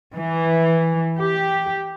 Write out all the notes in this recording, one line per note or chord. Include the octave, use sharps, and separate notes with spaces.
E3
G4